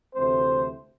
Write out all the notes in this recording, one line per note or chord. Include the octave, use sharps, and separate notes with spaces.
D2 C3 E3 A3 C4 C5